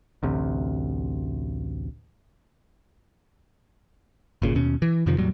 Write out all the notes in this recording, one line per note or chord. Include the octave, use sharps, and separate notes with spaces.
A1 D2 C3
G1 A#2 C#3
D#2 B2 C#4
E3
F2 C3 D#3 F3
E2 A2 F#3 G3